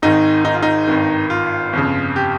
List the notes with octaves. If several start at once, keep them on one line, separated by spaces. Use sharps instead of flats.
G#1 G#2 D#3 D#4
D#4
F4
D#4
G#1 G2 D#3
F4
G1 F2 C#3
G4